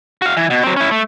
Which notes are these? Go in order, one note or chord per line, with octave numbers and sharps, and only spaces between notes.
F#4 F5
E3
B2
F#3 C4
C#4 E4
A3